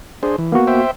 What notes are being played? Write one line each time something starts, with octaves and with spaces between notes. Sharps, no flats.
D4 G#4 C5
E3
A#3 B3 F#4
C5 E5 G5